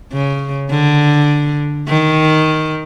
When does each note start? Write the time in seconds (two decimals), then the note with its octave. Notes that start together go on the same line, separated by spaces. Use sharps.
0.12 C#3
0.71 D3
1.88 D#3